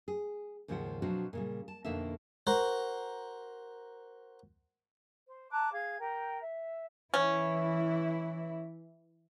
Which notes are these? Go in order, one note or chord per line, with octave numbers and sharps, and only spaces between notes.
G#4
D#2 G#2 C#3 F3 G4 F#5
B2 F3 F#3 C4 D4 F#4
A#2 C#3 G3
A5
F2 B2 D3 A#3 D#4 E5
F#4 A#4 C5
C5
A5 A#5 D6 F#6
G#4 F5 G#6
G4 A#4 G5
E5
E3 C#4 E4